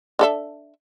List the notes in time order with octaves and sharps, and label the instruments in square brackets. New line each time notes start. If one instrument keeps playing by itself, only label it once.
[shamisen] D4 A4 E5